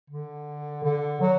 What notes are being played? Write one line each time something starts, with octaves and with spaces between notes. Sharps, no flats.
D3
D3
F#3